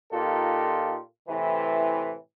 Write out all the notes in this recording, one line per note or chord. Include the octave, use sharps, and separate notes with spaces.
A#2 D#4 F4 G4 A4
A2 C3 E3